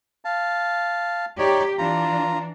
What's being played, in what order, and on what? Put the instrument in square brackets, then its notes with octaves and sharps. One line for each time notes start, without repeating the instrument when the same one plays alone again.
[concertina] F5 A5
[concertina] D#4 C#5 D5 [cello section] G4
[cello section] E3 D4 [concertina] F4 A#5